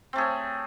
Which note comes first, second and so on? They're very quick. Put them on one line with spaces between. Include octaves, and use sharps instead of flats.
C4 A3 G#4 C#5